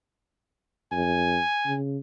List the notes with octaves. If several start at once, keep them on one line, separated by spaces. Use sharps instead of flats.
F2 G#5
C#3